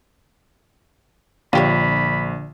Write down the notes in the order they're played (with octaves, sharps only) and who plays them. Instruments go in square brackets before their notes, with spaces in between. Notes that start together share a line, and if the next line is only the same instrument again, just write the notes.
[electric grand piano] A#1 [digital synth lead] D3 [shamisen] F4 G4 C#5 [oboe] B5